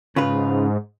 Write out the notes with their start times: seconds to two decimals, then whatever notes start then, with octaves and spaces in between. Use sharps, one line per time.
0.16 G#2 C#3 F4 B4